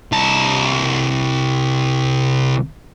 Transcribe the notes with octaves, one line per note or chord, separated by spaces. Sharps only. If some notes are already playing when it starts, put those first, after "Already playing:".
C2 A5